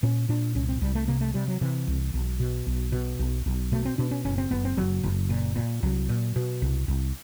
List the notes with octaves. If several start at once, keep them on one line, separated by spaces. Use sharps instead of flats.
A#2 C#4
A#2 D4
C2 C#4
C4
C2 G3
A3
C3 A#3
A3
C3 G3
F#3
C3 E3
C2
B1
B2
B1
B2
B1
B1
B2 A3
C4
B2 D4
C#4
F#1 C#4
C4
F#1 B3
C4
F#1 F#3
F#1
A#2
A#2
C2 F#3
A#2
B2
C2
C2